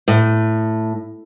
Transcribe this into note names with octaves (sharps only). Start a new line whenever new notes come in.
A2